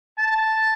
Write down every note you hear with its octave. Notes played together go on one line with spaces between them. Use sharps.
A5